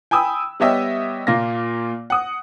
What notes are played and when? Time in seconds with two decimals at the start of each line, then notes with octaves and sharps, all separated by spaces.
0.11 G5 G#5 B5 D#6 E6
0.60 G3 B3 G4 C#5 D#5 E5
1.27 A#2 A#3 F4 A#6
2.10 F#5 D#6